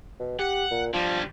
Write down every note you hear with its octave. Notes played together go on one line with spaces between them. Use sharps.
B2
G4 F#5
A#2
D3 F3 G3